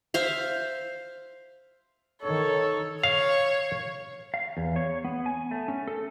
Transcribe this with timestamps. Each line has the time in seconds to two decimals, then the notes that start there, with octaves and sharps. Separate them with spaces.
0.14 C5 E5 F5
2.23 D#3 A4 C#5
3.03 C#5 F5
4.34 F5
4.57 E2
4.76 C#5
5.05 B3
5.26 G#5
5.51 A3
5.68 C#4
5.88 A4